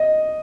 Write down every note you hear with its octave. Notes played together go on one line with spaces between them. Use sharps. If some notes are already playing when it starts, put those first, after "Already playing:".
Already playing: D#5